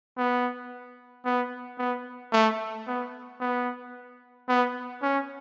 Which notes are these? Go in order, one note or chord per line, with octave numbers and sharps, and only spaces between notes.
B3
B3
B3
A3
B3
B3
B3
C#4